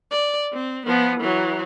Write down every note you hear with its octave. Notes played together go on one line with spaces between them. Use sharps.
D5
C4
F3 B3
E3 F#3